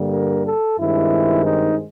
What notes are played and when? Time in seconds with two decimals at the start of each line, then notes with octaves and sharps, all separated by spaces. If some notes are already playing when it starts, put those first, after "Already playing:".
Already playing: G2 D3 G3 A#3
0.13 A#4
0.47 A4
0.80 G2 D#3 G#3 C4 E4
1.46 D#4